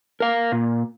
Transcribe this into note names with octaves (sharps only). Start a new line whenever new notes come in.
A#4 F5
A#2